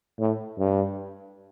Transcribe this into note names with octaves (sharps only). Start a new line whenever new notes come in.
A2
G2